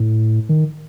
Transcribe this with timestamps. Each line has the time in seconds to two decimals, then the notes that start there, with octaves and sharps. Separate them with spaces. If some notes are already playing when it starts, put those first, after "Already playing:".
Already playing: A2
0.49 D#3